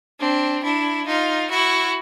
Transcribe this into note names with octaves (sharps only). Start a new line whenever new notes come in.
C4 D4
D4 E4
D#4 F4
E4 F#4